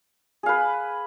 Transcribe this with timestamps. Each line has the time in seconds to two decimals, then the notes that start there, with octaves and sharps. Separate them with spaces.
0.43 G#4
0.46 F5
0.49 B4